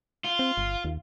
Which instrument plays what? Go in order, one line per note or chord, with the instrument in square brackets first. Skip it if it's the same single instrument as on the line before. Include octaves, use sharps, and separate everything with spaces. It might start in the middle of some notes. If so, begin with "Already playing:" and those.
[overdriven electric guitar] F4
[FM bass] C4
G1
D#2